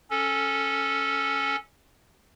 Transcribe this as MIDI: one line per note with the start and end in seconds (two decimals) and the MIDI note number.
0.11 1.56 61
0.11 1.56 69